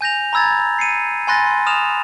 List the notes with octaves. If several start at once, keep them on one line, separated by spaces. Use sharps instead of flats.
G#5 G6 A#6 F7
A#5 B5 E6 G#6 A6
C7 C#7 D#7
G#5 B5 C6 F#6 A6 A#6
C6
D#6 F6 E7 F7